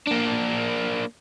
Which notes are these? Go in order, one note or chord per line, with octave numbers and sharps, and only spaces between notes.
A#3 D4